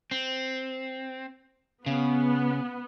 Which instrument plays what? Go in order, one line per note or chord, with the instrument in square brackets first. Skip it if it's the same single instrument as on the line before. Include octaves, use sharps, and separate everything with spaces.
[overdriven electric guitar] C4
[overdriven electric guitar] C#3 [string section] B3